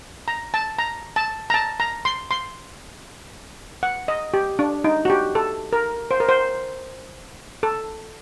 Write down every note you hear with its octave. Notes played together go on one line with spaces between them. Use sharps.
A#5
A5
A#5
A5
A#5
A5
A#5
C6
C6
F#5
D#5
G4
D4
D#4
F#4
G4
A4
A#4
C5
A#4
C5
A4